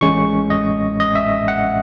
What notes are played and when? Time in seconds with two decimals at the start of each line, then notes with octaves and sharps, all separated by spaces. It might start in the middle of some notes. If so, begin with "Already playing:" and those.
0.01 A1 A2 G#3 C#4 C#6
0.50 D#5
1.00 D#5
1.15 E5
1.48 F#5